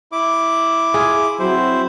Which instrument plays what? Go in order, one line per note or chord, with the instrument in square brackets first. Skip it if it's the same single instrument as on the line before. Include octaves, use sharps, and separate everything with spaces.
[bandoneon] E4 D6
[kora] F4 G#4
[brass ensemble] F#3 C4 F#4 [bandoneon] E4 C5